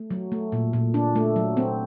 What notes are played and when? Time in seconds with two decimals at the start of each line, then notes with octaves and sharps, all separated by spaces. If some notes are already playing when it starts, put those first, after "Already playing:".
Already playing: A3
0.11 F#3
0.32 A3
0.52 A#2
0.73 A#2
0.94 D4
1.16 A3
1.36 F#3
1.57 C4